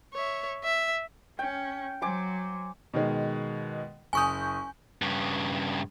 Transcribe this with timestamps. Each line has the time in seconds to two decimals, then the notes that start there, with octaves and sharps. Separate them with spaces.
0.14 C#5 E5
0.64 E5
1.39 C#4 G5
2.02 F#3 C5 G#5 D6
2.94 B2 D#3 G#3
4.13 F#1 G#5 C#6 D#6 G6
5.02 G2 C#3